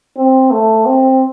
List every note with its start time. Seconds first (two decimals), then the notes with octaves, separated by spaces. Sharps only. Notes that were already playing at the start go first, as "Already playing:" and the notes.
0.17 C4
0.51 A3
0.86 C4